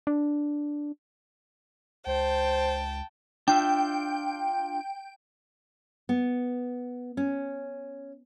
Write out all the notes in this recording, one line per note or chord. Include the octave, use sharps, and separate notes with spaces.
D4
C#2 C5 G5 A5
D4 F4 E5 G5
B3
C#4